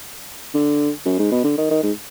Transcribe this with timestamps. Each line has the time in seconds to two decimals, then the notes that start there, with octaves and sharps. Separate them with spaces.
0.54 D3
1.05 F#2
1.19 G#2
1.31 B2
1.44 D3
1.58 D#3
1.71 D#3
1.83 G#2